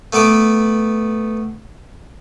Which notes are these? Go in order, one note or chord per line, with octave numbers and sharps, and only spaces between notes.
A3 B3 B4 D6